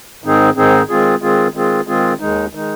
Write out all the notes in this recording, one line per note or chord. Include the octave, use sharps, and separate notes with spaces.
G#2 D#3 C4 D#4 G#4
G#2 D#3 C4 D#4 G#4
D#3 G#3 C4 F4 G#4
D#3 G#3 C4 F4 G#4
D#3 G#3 C4 F4 G#4
D#3 G#3 C4 F4 G#4
D#2 D#3 G#3 D#4
D#3 G#3 D#4